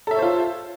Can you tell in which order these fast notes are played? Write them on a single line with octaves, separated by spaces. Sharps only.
A4 E5 C#5 C5 F4